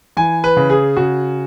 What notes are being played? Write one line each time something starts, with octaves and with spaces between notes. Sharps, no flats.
E3 G#5
B4
C#3
G#4
C#3 F#4